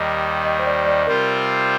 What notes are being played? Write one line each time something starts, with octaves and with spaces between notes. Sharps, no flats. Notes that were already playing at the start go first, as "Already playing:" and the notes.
Already playing: D#2 D#3 G3 D#5
D#5
C5
D5
D5
C3 G3 C4 F4 A#4 C5